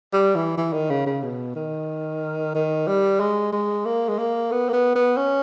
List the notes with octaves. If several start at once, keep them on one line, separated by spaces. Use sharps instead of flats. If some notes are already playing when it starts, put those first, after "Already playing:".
G3
E3
E3
D#3
C#3
C#3
B2
D#3
D#3
G3
G#3
G#3
A#3
G#3
A#3
B3
A#3
B3
B3
C#4